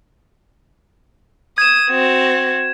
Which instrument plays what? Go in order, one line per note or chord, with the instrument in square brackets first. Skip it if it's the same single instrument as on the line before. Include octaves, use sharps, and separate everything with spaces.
[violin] D#6 [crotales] G#6 E7
[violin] C4 F#4